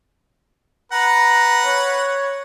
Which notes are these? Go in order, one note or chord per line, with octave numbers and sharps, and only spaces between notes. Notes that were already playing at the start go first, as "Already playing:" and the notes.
B4 F#5 A#5
C#5